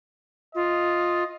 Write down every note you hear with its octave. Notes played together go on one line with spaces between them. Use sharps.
F4 D#5